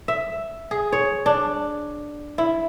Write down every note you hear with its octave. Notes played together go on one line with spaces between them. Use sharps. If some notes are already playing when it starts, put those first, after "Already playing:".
E5
G#4
C#5
D4
E4